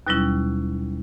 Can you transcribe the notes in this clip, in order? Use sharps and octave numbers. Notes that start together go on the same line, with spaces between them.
D#2 B2 F#3 G3 C#4 E4